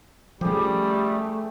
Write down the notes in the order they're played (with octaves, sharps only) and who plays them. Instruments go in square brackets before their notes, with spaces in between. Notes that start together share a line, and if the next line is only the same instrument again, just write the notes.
[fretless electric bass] F3 C#4 [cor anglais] G3 [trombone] A3 [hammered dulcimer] G4 G#4